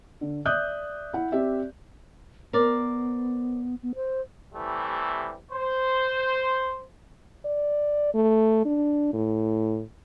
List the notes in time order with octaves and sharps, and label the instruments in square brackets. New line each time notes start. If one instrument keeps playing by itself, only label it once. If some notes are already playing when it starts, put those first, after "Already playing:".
[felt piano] D3
D5 E5 D#6 F#6 G6
E4 F#5
C4 G4 D5 E5
[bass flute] B3 [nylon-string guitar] A#4 C5 D5
[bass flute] B3
C5
[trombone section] C3 E3 G3 A3
C5
[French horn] D5
A3
D4
A2